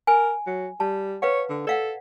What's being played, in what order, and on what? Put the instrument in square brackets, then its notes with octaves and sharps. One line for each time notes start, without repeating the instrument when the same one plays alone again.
[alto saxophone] A#4 [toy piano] G#5
[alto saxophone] F#3
[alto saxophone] G3 [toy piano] A5
[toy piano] B4 F5 F#5 [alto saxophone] C#5
[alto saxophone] D3
[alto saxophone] A4 [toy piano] D5 F5 F#5